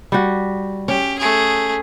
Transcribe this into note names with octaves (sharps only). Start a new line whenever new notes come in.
G3 F#4
C#4 G4
A3 G#4